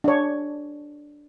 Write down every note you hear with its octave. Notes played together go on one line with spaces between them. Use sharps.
D4 C#5